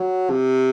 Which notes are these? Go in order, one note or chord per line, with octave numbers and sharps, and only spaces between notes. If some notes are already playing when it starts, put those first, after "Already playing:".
Already playing: F#3
C3